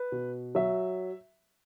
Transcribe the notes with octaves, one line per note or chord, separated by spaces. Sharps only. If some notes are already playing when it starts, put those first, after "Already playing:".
Already playing: B4
B2
F#3 E5